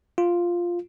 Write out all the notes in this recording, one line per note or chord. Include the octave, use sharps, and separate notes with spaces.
F4